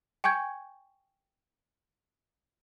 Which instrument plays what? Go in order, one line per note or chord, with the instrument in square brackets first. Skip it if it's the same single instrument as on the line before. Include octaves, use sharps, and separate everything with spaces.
[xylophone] G5 G#5 C#6 G6 G#6